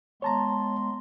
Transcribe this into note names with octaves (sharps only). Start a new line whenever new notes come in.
G#3 B3 C#5 A5 A#5 C6